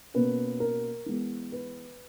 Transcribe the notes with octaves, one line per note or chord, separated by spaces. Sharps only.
B2 A#3 C#4 B4
A#4
E3 G#3 B3
B4